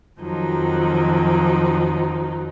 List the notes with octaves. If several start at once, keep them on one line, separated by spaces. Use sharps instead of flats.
F2 D#3 F3 F#3 D#4